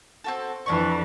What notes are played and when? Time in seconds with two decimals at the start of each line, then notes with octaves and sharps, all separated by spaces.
0.24 C4 F#4 A4
0.66 F2 E3 D4 D5 C#6